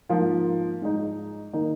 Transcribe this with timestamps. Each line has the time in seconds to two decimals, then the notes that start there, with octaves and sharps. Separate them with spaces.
0.09 G#2 F3 A#3 F4 A#4
0.82 G#2 G#3 D#4
1.53 D#3 A#3 D#4